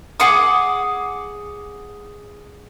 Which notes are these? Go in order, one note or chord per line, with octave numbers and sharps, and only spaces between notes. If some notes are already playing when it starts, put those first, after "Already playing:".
G#4 F#5 D6 D#6